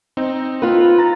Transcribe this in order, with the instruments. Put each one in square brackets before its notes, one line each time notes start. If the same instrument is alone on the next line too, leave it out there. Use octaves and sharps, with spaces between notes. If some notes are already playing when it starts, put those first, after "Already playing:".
[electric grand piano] C4 D#4
[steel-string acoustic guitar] F4 B4
[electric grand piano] A#5 A6